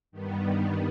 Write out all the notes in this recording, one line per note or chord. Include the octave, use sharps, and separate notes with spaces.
G2 D#3 G3 B3